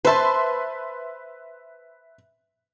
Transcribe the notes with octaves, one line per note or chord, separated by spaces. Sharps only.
B4 C5 E5 A5 C6